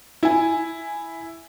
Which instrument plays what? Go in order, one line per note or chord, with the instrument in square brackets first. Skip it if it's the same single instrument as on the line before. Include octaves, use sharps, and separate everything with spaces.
[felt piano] E4 G#5